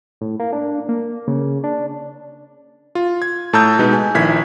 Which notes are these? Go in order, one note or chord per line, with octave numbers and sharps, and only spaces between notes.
A2
A#3
D4
A#3
C#3
D4
F4
G#6
A2 A5 A#5 E6 G6
B2 G#3 D#4 B4
G#5
A#1 D#3 E4 G#6 B6